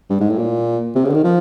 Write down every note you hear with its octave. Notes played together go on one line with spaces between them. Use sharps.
G2
G#2
A2
A#2
C3
C#3
D3
D#3
F3